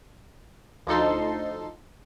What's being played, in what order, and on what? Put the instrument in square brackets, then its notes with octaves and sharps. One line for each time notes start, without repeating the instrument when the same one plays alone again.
[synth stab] D2 F3 D#4 A4 C6